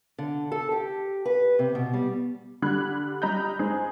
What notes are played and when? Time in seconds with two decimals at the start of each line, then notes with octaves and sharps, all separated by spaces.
0.18 D3
0.52 A4
0.72 G4
1.25 B4
1.59 C3
1.75 B2
1.93 G3
2.62 D3 G3 B5 F#6 G#6
3.22 G3 D#5 A#5 B5 G6
3.59 G#3 D#4 G#4 C5